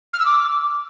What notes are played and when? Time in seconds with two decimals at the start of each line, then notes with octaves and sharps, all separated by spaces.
0.13 F6
0.19 E6
0.25 D6